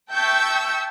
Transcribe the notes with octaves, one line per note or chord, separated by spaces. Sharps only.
E5 G5 A5 C#6 E6 G6